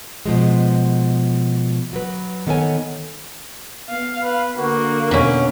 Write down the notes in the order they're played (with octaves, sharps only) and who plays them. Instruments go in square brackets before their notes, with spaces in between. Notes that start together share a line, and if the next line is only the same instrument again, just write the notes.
[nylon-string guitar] B2 F3 G#3
F#3 B4
D#3 B3 A4 C#5 G#5
[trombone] B3 [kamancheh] F5
[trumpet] B4
[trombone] D3 [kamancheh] A#3 [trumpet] F#4
[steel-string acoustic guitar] B2 C#4